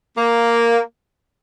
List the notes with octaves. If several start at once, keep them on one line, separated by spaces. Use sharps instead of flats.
A#3